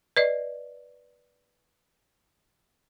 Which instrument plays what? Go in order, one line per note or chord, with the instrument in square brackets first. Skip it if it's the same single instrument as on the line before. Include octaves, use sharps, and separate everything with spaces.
[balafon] B4 D5 D#5